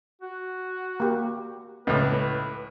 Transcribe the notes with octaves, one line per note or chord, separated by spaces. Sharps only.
F#4
A#3 G4
C#2 A2 B4